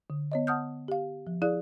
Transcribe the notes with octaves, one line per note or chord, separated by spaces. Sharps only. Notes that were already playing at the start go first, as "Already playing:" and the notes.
D3
B3 C#5 D#5
F#5 A5 D#6 F6 G6
G4 F5
F3
E4 G#4 D5 F5 F#6